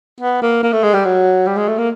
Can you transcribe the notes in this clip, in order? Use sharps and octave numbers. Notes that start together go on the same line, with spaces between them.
B3
A#3
A#3
A3
G#3
G3
F#3
G3
G#3
A3
A#3